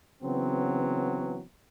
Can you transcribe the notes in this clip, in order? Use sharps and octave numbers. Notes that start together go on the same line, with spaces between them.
C#3 E3 F#3 B3 C4